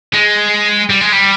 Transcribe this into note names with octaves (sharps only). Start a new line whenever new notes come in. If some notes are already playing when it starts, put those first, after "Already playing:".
G#3
G3
G#3
G3